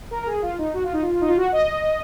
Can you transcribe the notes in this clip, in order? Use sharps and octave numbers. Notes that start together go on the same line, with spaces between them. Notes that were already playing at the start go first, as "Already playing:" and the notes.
A#4
A#4
G#4
F4
D#4
F#4
F4
D#4
F4
D#4
F4
F#4
D#5